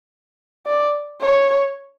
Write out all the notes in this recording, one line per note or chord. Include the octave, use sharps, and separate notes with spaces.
D5
C#5